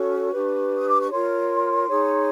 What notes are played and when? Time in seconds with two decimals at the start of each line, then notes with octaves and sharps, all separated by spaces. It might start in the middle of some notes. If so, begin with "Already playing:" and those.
Already playing: C#4 F#4 A4 C#5 C#6
0.31 D4 G4 B4
0.78 D#6
0.89 D6
1.00 C#6
1.10 F4 A#4 C#5 C6
1.89 D#4 G#4 C#5